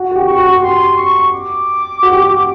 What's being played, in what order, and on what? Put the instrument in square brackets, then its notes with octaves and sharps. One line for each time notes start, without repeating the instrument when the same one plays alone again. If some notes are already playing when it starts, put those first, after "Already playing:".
Already playing: [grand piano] F#4
F#4
G4
[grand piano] G4 [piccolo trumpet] C#6
[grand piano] F#4
[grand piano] G4 [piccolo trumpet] C6
[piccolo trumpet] C#6
D6
[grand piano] F#4
G4
F#4